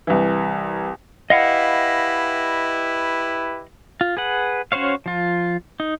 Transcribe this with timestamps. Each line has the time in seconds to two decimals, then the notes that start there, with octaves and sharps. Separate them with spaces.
0.07 C2 E3
1.30 E4 G4 B4 D#5 F5 F#5
4.01 F4
4.17 G#4 B4 F#5
4.72 C#4 F#4 C5 C#5 F5
5.06 F3 F4
5.80 D#4